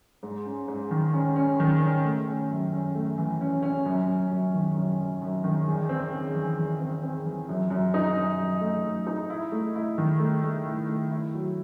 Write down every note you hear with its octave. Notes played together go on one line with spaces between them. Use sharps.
G#2
C#4
G#2
D#3
C#4
C#4
D#3
C#4
A3
C#4
F#2
C#4
A3
E3
C#4
C#4
F#2
F#2
F#2
D#3
F#2
F#2
F#2
D#3
E2
C4
C#3
E3
E2
C4
C4
E3
F#2
F#2
D#4
F#2
F#2
A3
F#2
D#4
E4
A3
E4
D#3
A3
A3
E4
A3
E4
F#3